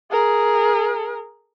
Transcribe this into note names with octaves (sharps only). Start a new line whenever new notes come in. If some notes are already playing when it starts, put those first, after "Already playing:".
G#4 A#4